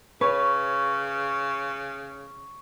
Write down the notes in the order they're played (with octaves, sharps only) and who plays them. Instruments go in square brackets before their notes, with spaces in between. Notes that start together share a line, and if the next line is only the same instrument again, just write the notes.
[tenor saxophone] C#3 [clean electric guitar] B4 [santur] C#5